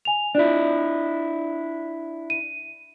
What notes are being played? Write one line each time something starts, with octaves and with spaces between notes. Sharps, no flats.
G#5 F7
D4 E4 F4 D5
D#7